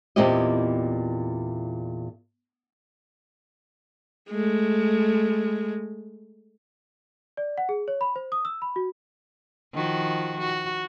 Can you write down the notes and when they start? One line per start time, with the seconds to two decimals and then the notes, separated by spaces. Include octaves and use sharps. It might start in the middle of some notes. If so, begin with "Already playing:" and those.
0.16 E2 A#2 C4 E4 G4 D#5
4.30 G#3 A3
7.37 D5
7.58 F#5
7.69 G#4
7.88 C#5
8.01 B5
8.16 C5
8.32 D#6
8.45 E6
8.62 B5
8.76 F#4
9.73 D#3 F3 F#4
10.40 F#4